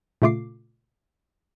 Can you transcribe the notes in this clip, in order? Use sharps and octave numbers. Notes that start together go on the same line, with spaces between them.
A#2 C#3 A3 F4 D6 C7